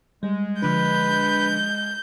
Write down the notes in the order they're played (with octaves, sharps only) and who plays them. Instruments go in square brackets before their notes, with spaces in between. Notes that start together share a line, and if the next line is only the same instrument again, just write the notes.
[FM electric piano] G3 [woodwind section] G#3
[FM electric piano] D3 F3 D4 [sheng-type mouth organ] B4 [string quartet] G6